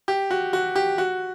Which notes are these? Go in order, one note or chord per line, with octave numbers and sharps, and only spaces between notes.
G4
F#4
F#4
G4
F#4